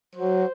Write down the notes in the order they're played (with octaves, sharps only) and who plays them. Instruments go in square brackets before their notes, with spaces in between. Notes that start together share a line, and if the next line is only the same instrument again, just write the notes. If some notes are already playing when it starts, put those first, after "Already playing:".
[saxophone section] F#3 [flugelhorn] C5